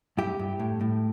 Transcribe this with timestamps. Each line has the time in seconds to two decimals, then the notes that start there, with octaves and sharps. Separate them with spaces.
0.17 G2 E4 G4
0.39 G2
0.59 A2
0.81 A2